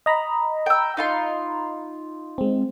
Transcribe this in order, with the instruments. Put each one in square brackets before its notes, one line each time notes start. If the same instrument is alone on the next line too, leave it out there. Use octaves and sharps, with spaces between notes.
[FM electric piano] D#5 A#5 B5
[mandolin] G5 E6
D#4 F4 C6
[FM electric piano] G#3 C4